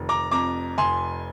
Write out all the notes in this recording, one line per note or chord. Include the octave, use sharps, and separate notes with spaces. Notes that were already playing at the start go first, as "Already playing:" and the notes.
Already playing: F1 D#3
A#5 D6
F2 A#5 D6
F1 G#5 C6